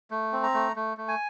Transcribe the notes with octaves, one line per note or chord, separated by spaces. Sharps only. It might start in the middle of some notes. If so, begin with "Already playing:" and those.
A3
C4
A#5
A3
A3
A3
G#5